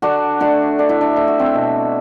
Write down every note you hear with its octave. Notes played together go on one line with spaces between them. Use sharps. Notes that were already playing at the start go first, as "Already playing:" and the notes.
D3 D4 F#4
A3 D4 F#4
D3 D4
E4
D4
A3 E4
F#4
C4 E4
B2